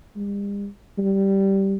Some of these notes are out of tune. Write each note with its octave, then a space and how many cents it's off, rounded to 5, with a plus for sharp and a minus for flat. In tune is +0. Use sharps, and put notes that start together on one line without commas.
G3 +45
G3 -10